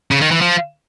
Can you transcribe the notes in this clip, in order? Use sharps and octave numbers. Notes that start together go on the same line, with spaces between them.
C#3
D#3
E3
F3